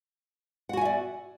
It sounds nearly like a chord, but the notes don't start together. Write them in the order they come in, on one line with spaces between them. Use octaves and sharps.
F#5 F#4 G#5 E5 D5